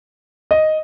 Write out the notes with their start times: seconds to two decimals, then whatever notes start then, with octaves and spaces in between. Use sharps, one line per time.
0.51 D#5